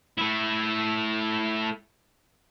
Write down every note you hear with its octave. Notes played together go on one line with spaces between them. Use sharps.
A3 E4